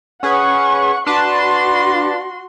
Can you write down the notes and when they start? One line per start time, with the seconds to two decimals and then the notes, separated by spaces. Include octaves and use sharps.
0.23 C#4 G#4 B4 F#5 C#6
1.07 D4 F#4 B4 A5 C6